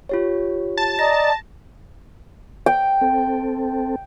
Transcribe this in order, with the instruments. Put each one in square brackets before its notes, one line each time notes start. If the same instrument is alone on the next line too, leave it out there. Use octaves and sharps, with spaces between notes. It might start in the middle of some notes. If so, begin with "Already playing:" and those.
[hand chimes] F4 G4 C#5
[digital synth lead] A5
[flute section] D5 D#5 A#5 [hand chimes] A#6
[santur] G5
[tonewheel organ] C4 A4